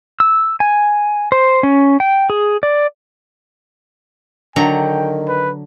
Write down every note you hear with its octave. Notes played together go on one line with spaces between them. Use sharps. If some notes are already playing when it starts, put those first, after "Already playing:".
E6
G#5
C5
C#4
G5
G#4
D5
D3 D#3 F#3 G5 A#5
B4